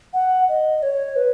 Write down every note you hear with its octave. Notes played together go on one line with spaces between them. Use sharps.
F#5
D#5
C#5
B4